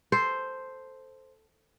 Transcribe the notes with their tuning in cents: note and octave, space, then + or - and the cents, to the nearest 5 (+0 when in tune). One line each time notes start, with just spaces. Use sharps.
A4 +0 C5 +0